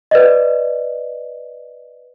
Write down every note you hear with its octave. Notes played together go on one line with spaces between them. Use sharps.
B4 D5 D#5